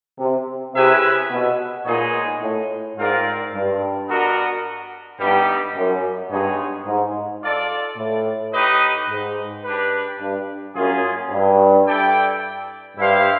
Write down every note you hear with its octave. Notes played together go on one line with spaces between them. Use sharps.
C3
C3 C#4 E4 G#4 B4 E5
B2
A#2 G#3 B3 D#4 G#4 C#5
A2
G#2 C4 F4 A#4 D5 F5
G2
B3 D4 F#4 A#4 D#5
G2 G3 B3 D#4 G4
F#2
G2 G#3 B3 D#4 G#4 C#5
G#2
F4 A4 D5
A2
D#4 G4 B4 D#5
G#2
D4 G4 B4
G2
F#2 A#3 C#4 F4 G#4
G2
E4 A4 D5 G5
G2 E4 G4 C5 F5